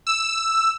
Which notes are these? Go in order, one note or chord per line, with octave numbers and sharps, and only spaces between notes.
E6